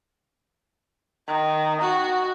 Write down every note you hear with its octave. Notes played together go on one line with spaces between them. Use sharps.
D#3
F#4